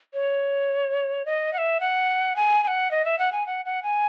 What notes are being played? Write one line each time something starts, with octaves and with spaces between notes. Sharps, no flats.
C#5
D#5
F#5
E5
F#5
G#5
G#5
F#5
D#5
E5
F#5
G#5
F#5
F#5
G#5